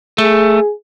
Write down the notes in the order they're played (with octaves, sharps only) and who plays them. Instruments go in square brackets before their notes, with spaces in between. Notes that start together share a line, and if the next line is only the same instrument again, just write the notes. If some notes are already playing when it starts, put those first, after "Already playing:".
[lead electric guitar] A3 [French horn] G#4